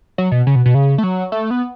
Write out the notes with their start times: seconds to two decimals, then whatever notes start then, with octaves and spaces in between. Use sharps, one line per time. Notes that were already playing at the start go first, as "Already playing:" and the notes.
0.18 F#3
0.32 B2
0.47 C#3
0.55 B2
0.66 B2
0.75 C#3
0.98 A3
1.03 F#3
1.32 A3
1.51 B3